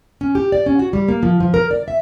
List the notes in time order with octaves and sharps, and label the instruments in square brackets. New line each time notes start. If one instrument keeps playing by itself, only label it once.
[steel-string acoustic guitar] C#4
G4
D5
C#4
F#4
G3
A#3
F3
F3
A#4
D5
E5